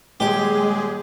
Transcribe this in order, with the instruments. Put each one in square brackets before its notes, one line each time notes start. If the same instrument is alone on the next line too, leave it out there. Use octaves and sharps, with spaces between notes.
[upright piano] D#1 [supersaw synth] G#3 G#4 [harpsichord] G4